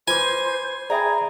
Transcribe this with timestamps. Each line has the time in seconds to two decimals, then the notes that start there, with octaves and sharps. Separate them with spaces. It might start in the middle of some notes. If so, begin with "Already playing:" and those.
0.08 F4 B4 C5 G#5 D6
0.90 G#4 D5 E5 G5 A#5 B5